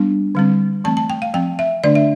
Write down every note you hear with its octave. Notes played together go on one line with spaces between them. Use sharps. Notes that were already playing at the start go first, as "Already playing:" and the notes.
Already playing: G3 B3 D4
D3 G3 C4
E3 A3 C4 A5
A5
G5
F5
F3 C4 G5
E5
D3 A3 D4 D5
E5